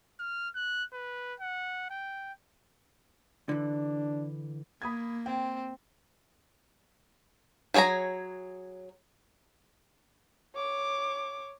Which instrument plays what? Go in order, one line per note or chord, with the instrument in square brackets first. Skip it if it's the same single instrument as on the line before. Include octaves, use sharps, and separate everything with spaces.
[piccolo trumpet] F6
F#6
B4
F#5
G5
[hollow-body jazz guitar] D3 E3 [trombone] D4
[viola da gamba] A#3 [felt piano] B5 D#6 G#6
[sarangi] C4 [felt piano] G5
[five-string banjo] F#3 G#4 C#5 G#5 A#5
[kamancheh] C#5 D6